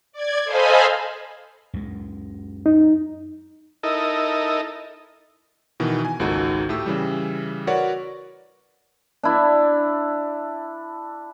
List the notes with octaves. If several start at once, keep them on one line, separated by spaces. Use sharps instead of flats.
D5 G#6
A4 C5 D#5 F5 G#5 B5
F#2 G#3
D#4
D#4 E4 A4 A#4 D#5
B2 D#3 E3
G#5
G#1 C#2 A#3 D#4 F#4 A4
A2 A3 G4 E6
C#3 E3 G3
F#4 A#4 B4 C#5 D5 F#5
D4 E4